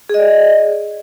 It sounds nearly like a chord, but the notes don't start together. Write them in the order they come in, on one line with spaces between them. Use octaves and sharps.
G#4 D#5 D5